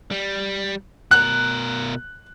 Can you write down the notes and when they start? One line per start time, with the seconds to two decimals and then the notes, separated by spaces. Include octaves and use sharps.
0.11 G3
1.11 B2 A#4 F#6